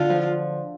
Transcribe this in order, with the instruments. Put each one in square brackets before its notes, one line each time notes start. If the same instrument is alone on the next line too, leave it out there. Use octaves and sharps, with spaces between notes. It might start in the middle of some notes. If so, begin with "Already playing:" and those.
Already playing: [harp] D3 [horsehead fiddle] F4
[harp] F3